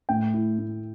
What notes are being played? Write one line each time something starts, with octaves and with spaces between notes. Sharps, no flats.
A2 G5
E4
A2